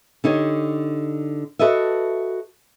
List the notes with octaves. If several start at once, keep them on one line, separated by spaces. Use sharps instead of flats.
D3 D#4 G4 C#5
F#4 A4 B4 D#5 E5